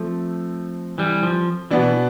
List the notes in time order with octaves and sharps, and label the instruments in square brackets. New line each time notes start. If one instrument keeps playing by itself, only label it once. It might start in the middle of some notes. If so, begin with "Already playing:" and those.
Already playing: [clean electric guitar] F3 A3 [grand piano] C4 A4
[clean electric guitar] E3 G3
F3
[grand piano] B2 B3 D4 [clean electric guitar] E3